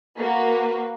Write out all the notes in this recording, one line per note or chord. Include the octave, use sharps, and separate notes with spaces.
A#3 F#4 B4